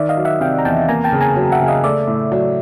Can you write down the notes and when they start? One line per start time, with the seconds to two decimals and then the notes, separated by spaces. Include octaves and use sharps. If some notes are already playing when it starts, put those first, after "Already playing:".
Already playing: D#3 D5 E5
0.09 D#5 F5
0.17 F#3
0.25 E5 F#5
0.40 C3 F5 G5
0.58 A#5
0.64 E2 G5 A5
0.88 A#3 G#5 A#5
1.04 G5 A5
1.12 C#3
1.21 G#5 A#5
1.36 F#3
1.52 E5 F#5
1.60 C#3
1.68 D#5 F5
1.84 A3 D5 E5
2.08 A2
2.32 F#3